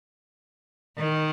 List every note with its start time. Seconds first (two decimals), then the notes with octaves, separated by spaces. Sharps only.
0.98 D#3